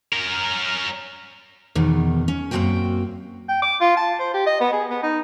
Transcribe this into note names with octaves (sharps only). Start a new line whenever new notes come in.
C#4 A#4
E2 B2 D#3
C#4
F#2 A#2 F3 C4 F#4 G5
G5
D6
F4
A5
C5
G4
D#5
B3
G#4
B3
D#4